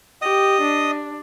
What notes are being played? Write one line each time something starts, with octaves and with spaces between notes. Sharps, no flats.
G4 D#5 D#6
D4